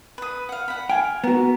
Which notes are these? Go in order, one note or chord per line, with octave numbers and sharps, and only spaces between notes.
B4 D#6
F5 F#5
F#5 B5
F5 G5 G#5
B3 F#4 A#4